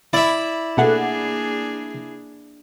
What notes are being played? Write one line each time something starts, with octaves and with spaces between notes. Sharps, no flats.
E4 D5 E5
B2 A3 A#3 D4 G#4 F#5